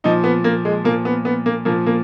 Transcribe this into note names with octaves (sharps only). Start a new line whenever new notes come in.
A#2 F3 D#4
B3
A#3
G#3
A#2 F3 A#3
B3
B3
A#3
A#2 F3 A#3
A#3